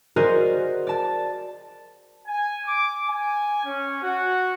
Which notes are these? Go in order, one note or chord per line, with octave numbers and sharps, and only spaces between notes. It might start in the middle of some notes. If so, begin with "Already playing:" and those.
F#4 G#4 A#4 C5 D5 D#5
D5 A5
G#5
D6
G#5
C#4
F#4